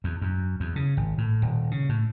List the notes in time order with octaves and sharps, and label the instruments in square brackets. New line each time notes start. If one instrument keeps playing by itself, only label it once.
[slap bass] E2
F#2
E2
C#3
G#1
A2
D#1
C#3
A2